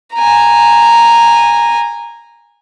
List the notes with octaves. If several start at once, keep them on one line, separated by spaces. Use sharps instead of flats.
G#5 A#5